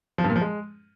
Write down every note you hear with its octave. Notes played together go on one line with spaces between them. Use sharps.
F3
G2
A#2
F3
G#3